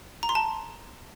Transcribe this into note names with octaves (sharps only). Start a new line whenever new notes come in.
A#5
C6
A5